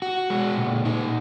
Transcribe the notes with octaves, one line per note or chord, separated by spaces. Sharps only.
F#4
G#3
A#2
D#4